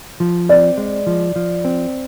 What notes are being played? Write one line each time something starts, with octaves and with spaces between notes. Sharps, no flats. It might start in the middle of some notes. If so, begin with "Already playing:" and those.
F3
C4 D5
G#3
F3
F3
C4